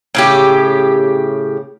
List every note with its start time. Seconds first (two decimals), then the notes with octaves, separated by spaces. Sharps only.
0.15 A2 C#3 G4